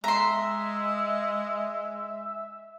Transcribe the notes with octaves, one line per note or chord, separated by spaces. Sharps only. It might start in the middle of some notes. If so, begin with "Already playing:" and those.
G#3 E5 A#5 C6